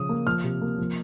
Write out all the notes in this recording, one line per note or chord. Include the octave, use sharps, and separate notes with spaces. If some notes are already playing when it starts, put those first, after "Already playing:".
Already playing: C#3 F3 D#6
A#3
F3 F6
C3
A#3
F3